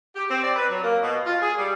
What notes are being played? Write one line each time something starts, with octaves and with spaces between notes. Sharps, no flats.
G4
C4
D5
B4
F#3
A#3
B2
F4
G#4
G3